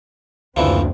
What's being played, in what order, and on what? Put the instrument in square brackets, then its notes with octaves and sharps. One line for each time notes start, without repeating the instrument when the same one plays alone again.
[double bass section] F#1 C4 [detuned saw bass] D2 [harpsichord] D3 E3 F3